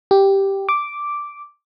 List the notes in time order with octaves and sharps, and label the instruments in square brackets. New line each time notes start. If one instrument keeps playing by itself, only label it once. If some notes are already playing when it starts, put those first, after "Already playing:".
[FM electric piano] G4
D6